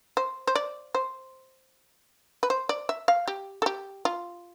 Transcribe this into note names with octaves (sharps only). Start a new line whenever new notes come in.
C5
C5
D5
C5
B4
C5
D5
E5
F5
G4
A4
G4
F4